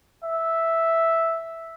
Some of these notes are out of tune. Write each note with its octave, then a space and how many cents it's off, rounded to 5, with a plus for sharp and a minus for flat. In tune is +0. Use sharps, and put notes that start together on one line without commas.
E5 -5